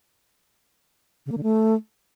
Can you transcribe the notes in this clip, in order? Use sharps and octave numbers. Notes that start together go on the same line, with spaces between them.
C#3
A#3
D3
A3